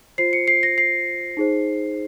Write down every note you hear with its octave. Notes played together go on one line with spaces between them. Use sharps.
F4 C5 C7
C#7
C7
A#6
C7
D#4 G#4 C5